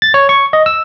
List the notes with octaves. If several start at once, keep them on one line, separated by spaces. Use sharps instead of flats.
A6
C#5
C#6
D#5
E6